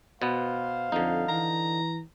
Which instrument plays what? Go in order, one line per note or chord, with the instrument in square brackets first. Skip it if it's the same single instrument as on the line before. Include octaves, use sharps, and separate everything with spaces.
[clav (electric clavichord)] B2 B3 [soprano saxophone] C5 [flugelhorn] F5
[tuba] F2 [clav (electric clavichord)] D3 D#4
[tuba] E3 [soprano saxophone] A#5